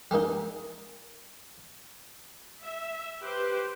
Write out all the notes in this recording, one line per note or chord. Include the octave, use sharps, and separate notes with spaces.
G3 G#3 A#3 D#4
E5
G4 B4 C5